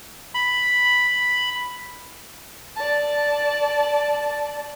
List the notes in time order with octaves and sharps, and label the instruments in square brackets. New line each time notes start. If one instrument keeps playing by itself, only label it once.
[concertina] B5
[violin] D5 A5